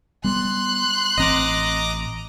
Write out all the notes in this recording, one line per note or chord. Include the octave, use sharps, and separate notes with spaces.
G3 B3 C6 F#6
A1 C4 D#5 A#5 D6